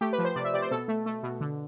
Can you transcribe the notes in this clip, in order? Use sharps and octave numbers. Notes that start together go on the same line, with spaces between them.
A3 G4
B4
F3
C5
C3 D5
E5
C3 D5
C5
B2 A4
A3
A3
B2
D3